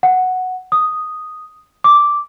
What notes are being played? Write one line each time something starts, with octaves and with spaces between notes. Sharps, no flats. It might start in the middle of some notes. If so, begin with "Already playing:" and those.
F#5
D#6
D6